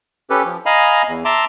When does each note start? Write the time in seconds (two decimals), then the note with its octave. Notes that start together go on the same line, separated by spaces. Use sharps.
0.30 C#4 G4 A4 B4
0.45 F3
0.66 D#5 F5 G#5 A#5 B5
1.08 E2
1.25 E5 A5 A#5 C6 D6